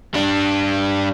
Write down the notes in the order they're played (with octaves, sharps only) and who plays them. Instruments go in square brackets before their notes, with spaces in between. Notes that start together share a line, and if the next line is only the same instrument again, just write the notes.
[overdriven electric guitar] G3 D4